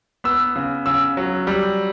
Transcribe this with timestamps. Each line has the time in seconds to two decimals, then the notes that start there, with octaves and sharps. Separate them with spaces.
0.24 B3 E6
0.56 C#3
0.86 C#3 E6
1.17 F#3
1.47 G3